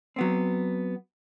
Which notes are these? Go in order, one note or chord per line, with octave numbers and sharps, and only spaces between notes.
F#3 B3 C4